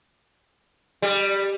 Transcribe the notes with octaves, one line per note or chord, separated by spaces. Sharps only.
G3